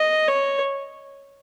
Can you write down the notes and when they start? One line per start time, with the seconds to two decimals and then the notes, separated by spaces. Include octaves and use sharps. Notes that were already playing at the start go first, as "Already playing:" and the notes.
Already playing: D#5
0.28 C#5